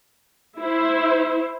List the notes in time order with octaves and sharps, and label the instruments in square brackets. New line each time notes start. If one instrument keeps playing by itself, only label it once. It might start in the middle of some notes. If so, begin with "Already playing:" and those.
[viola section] E4 C5